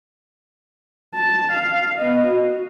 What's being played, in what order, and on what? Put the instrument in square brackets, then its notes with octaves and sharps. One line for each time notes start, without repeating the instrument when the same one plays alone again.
[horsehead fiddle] A5
F5
B3 D#5
F#4